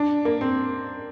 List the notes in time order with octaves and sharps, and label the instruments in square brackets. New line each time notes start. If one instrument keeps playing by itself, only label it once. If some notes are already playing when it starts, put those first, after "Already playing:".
Already playing: [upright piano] D4
A#3
C4